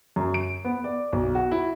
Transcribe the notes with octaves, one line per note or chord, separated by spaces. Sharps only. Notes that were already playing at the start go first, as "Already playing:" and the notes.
F#2
D7
B3
D5
B1
F#4
E4